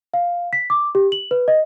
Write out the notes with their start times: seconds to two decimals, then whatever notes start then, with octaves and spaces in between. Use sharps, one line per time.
0.14 F5
0.53 B6
0.70 D6
0.95 G4
1.12 F#7
1.31 B4
1.48 D#5